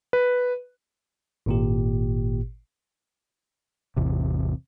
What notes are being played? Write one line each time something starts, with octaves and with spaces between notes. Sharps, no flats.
B4
G#1 A#2 G4
A1 E2 C3